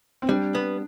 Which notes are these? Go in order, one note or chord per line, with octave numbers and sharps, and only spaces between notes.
C4
G3 D4
B3